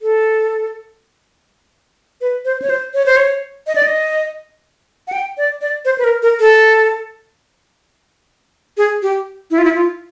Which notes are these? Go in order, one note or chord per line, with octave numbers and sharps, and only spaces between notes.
A4
B4
C5
C#5
C5
C#5
C5
C#5
D#5
D5
D#5
F#5
G5
D5
D5
C5
B4
A#4
A#4
A4
G#4
G4
E4
F4
E4
F4